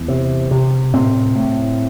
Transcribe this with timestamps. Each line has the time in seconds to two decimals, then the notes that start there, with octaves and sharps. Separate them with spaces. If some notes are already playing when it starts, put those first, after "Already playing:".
Already playing: E2
0.08 C3
0.51 C3
0.93 A2 C4
1.35 A2